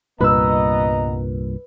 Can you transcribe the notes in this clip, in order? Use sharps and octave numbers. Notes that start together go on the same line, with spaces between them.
C2 G2 A#2 B3 B4 D#5 A#5 E6